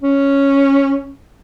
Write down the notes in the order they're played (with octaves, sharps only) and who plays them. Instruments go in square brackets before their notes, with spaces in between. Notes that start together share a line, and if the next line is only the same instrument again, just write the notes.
[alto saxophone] C#4